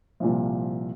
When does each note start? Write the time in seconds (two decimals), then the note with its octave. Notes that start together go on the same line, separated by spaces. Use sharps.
0.20 C2 A#2 F3